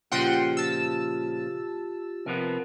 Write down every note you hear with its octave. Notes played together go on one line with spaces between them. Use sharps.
A#2 C#3 F3 F4 G4 F#5 G5 C6
A5 E6
C3 F3 B3 A#4